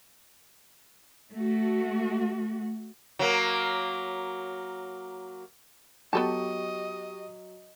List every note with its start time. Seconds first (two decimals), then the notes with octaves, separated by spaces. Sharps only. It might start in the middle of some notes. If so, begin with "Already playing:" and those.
1.32 A3 F#4
3.19 F#3 A#3
6.13 F#3 B3 G4 A4 D#5 A5 C#6